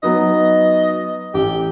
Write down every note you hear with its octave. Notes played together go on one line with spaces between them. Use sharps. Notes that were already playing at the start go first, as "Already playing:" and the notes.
F#3 B3 D#4 D#5
A1 G4